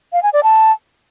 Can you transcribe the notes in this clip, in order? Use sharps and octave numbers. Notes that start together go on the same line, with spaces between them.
F5
G#5
D5
A5